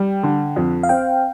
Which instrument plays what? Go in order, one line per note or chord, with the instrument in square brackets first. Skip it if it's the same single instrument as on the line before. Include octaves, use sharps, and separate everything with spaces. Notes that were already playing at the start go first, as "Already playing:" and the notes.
Already playing: [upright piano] G3 [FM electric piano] G5
[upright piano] D3
F2
[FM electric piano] F5
[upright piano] C4 [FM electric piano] G5